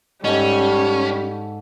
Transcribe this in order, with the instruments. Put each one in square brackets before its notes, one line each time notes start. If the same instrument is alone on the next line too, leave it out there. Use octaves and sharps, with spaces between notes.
[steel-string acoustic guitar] G#2 A4 [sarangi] G3 [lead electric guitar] C#4